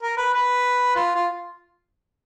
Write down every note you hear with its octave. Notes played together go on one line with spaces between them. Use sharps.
A#4
B4
B4
F4
F4